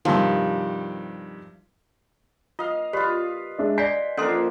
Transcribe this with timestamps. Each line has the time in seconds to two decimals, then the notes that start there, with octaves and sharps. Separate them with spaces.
0.05 G2 C3 D#3 F3
2.59 F4 D#5 F5
2.93 F4 G4 B4 D5
3.59 G#3 D4 E5
3.78 D5 E5 G#5 G6 B6 C7
4.17 F3 A#3 C#4 D4 A4 C6